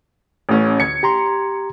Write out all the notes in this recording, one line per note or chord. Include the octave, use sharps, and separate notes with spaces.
A1 A2 C#4
D2 G#6 C#7
G4 A#5 C6